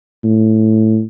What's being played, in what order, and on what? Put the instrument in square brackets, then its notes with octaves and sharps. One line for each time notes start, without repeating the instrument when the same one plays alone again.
[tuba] A2